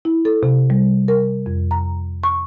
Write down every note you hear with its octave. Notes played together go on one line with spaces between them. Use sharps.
E4
A4
C3
G3
A#4
F2
A#5
C#6